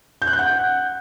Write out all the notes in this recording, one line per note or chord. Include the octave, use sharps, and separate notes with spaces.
G6
F#6
G6
F#5